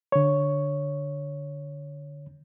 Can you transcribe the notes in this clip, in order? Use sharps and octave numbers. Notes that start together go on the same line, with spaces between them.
D3 C#5